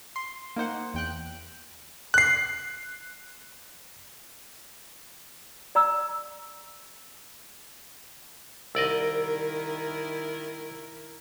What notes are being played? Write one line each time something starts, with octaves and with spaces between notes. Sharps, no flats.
C6
A#3 D#4 C5 F#5
E2 G5 F#6
F#6 C7
D5 A#5 E6
C2 D#3 E4 A#4 D5 D#5 E6 A#6